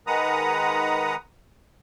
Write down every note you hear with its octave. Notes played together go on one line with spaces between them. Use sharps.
D#3 G#3 B4 F#5 A#5 D#6